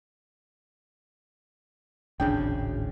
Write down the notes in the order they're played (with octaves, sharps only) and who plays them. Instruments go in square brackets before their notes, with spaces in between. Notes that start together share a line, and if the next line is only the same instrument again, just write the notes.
[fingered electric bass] D1 G#1 C#3 [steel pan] D4 G5